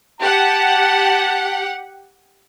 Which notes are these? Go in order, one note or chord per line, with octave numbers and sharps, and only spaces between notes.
G4 F#5 A5